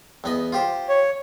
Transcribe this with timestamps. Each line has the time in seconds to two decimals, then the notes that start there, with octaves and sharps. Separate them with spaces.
0.24 E2 B3 D#5
0.52 F4 G4 C5
0.89 C#5